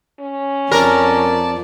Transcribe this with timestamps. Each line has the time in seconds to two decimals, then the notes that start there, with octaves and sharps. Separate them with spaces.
0.20 C#4
0.71 F2 A#4 D5 A5